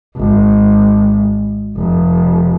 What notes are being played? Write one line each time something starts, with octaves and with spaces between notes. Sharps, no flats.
G#1
F1